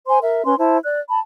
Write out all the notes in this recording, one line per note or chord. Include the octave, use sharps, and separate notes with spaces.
C5 G#5 C6
A#4 E5
C#4 B4 C6
E4 C5 A5
D5 F#6
A5 B5